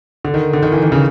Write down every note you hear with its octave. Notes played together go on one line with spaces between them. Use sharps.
D3
D#3
D3
D#3
E3
D#3
C#3